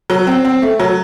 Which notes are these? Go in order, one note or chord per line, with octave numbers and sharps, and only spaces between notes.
F#3
C4
C4
A3
F#3